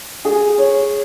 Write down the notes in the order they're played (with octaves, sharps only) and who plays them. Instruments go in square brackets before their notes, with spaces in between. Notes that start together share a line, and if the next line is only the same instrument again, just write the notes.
[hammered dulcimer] G#4
C#5